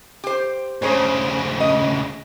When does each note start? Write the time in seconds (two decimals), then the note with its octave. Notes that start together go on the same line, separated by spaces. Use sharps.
0.24 G4 C5
0.82 D2 C#3 G#4 C5 C#5
1.60 D#5